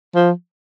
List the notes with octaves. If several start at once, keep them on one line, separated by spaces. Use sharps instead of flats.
F3